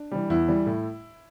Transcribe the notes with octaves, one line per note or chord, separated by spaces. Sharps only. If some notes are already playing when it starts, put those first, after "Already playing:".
Already playing: D4
E3 G3
E2 E4
E3 G3
A2